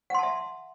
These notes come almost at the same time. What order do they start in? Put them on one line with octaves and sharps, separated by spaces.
F#5 C6 A5 E5